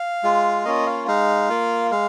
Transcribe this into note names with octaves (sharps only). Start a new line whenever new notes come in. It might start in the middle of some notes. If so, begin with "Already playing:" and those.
Already playing: F5
G#3 F4
A#3 C#4 F4 D#5
F5
G#3 D#4 F5
A#3 F4
G#3 F5